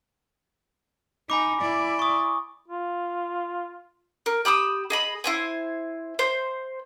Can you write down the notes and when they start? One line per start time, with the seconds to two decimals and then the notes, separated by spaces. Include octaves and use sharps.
1.30 D#4 G#5 B5 D6
1.61 E4 D5
1.99 C#6 D#6
2.68 F4
4.26 A#4
4.45 G4 B5 D#6 E6
4.90 G#4 D#5 B5
5.24 E4 C5 G#5
6.19 C5